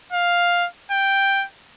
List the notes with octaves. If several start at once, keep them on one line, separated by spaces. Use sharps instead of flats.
F5
G5